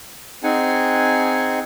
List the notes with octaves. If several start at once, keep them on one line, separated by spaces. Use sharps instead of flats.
C4 D#4 G#4 F#5 G#5